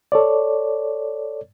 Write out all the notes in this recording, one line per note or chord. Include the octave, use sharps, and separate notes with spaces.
A4 C#5 D5